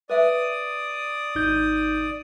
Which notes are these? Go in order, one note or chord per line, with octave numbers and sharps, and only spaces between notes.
B4 D5 E5 D#6
G#1 D#4 G6